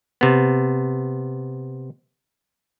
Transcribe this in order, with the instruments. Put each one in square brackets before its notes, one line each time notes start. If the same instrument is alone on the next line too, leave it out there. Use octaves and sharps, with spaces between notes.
[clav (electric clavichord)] C3 B3